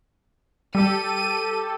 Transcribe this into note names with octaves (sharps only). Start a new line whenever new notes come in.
G3 G4 A4 D#7